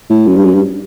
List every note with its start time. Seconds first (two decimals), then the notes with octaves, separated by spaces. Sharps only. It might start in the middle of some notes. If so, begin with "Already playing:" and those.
0.10 A2
0.27 F#2
0.36 G2
0.44 F#2
0.54 G2